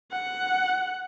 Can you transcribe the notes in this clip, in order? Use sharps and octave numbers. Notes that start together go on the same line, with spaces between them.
F#5